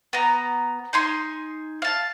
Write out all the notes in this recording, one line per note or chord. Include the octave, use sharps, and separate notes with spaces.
B3 A#5
D#4 G#5 C6
F5 A5